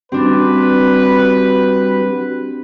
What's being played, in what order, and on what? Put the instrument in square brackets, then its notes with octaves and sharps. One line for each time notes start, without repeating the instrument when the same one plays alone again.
[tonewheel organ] G3 F#4 G4 [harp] C4 D4 [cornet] B4